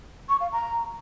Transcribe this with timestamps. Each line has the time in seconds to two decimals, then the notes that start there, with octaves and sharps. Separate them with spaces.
0.29 C#6
0.41 F5
0.52 A#5